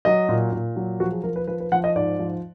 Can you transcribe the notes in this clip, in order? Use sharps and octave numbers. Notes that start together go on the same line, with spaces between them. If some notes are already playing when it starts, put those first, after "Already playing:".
F#3 D#5
A#2
A#2
F#3
F3 F#4
G#4
F3 A#4
B4
F3 B4
B4
F3 F#5
D#5
G#2 D5
F3